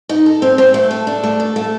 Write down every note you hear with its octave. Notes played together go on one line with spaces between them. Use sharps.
D#4
A4
C4
C4
A3
A4
D4
A3
A4
A3